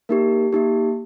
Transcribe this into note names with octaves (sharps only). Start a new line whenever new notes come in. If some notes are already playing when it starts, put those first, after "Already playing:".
A#3 D#4 G4 A#4
A#3 D#4 G4